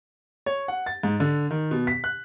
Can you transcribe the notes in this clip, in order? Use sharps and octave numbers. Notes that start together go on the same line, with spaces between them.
C#5
F#5
A6
G#2
D3
D#3
B2
B6
F#6